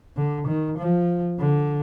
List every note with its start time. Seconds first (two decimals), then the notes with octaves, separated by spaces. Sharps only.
0.17 D3
0.47 D#3
0.78 F3
1.40 D3